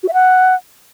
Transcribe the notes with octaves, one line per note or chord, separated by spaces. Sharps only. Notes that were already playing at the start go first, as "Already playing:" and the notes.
F#4
E5
F#5